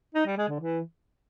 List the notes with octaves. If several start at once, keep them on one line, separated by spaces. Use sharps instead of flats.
D#4
G3
G#3
D3
E3